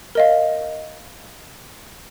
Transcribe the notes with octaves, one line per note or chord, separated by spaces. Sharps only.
A#4 D#5 F5